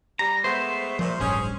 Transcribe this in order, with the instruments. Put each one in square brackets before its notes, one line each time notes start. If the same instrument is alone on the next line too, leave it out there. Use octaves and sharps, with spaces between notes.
[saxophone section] G3 [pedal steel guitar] A#5
[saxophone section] G#3 A3 B3 [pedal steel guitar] C5
[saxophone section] A#2 A3 [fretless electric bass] F3
[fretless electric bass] D1 A1 G2 [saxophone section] C#4 G#4